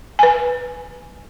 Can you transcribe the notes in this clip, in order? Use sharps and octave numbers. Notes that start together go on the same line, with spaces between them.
B4 G#5